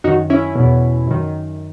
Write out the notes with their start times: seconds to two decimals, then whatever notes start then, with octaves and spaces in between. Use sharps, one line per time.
0.04 F#2 D#3 D#4 F#4
0.30 C#4 E4
0.55 E2 B2
1.07 F#2 D#3